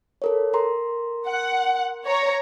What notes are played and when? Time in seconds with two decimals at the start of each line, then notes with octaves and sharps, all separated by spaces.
0.22 A4 A#4 C#5
0.54 A#4 A#5 C6
1.27 F#5
2.07 C#5 A#5